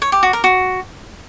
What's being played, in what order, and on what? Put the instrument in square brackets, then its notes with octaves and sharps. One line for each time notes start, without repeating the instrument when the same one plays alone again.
[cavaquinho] C#5
G4
F#4
A#4
F#4